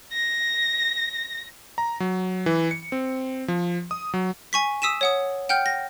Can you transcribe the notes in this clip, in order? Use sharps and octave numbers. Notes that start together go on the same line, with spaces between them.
A#6
A#5
F#3
E3
C#7
C4
F3
D#6
F#3
G#5 C#6 B6
D#6 E6 B6 D#7 E7
C#5 F#5 D#6
F#5 G5 F6 G6
A#6